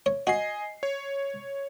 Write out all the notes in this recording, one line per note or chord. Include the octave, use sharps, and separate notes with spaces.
C#5
F#4 D#5 G#5 C7
C#5